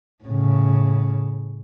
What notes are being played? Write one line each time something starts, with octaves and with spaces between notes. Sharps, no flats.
A2 C#3